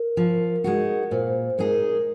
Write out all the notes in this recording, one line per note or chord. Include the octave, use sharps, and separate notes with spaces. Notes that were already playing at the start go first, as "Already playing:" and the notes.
Already playing: A#4
F3
G#3 D#4 F#4
A#2 C5
G#3 D#4 G#4 A#4